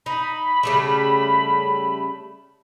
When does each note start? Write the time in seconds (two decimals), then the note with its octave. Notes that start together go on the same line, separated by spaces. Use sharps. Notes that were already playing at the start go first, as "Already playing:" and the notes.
0.06 D#4 B5
0.63 C#3 G3 A3